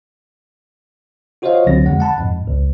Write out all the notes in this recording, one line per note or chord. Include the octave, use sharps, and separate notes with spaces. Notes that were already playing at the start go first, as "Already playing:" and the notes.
F4 F#4 C5 C#5 D#5 F5
C#2 D3 F#3 C4 A#6
F2 D3 G#3 F#5
F#5 A5 B5
F2 G#2
C#2